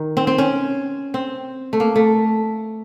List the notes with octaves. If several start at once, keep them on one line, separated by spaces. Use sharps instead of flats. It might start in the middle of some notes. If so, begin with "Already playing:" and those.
Already playing: D#3
C4
C4
C#4
C4
A3
A#3
A3